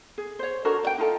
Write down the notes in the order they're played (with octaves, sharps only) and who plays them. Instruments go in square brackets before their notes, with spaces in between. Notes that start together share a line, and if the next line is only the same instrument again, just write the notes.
[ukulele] G#4
C5 C#5
D4 F#4 A4 A#4
D5 G5
D#4 F4 A4